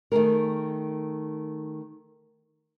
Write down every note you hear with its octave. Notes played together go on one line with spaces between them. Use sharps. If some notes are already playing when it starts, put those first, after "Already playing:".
D#3 A3 G#4 A#4